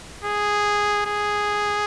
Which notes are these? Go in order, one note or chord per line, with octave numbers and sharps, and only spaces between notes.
G#4
G#4